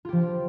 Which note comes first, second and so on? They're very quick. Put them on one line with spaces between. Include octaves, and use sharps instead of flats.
F4 G4 F3